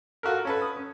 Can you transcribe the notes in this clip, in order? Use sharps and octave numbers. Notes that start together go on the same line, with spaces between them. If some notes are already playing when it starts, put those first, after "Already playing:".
F4 F#4 A4 A#4
C#4 A4 B4
D#6
C#4